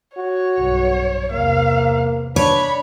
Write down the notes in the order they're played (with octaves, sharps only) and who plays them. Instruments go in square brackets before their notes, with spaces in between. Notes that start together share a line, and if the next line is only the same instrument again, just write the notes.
[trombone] F#4 [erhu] C#5
[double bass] B1 G2
[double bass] E2 C3 [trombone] A#3 [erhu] F5
[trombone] D4 [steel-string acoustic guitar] C#5 [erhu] B5